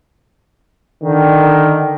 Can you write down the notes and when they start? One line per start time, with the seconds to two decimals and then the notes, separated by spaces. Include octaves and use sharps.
1.03 D3 D#3